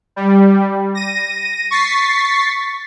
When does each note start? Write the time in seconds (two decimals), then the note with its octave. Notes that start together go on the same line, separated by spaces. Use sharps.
0.16 G3
0.95 A#6 D#7
1.71 C#6 A6 B6 C7